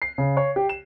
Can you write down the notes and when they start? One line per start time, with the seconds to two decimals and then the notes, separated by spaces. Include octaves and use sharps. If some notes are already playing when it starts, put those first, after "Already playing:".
0.02 C7
0.18 C#3
0.37 C#5
0.56 G4
0.69 E7